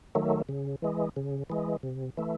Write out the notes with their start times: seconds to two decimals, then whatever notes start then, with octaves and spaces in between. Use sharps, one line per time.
0.15 D#3 F#3 A3
0.49 C#3
0.82 E3 G#3
1.16 C#3
1.50 E3 G#3
1.83 C3
2.17 E3 A3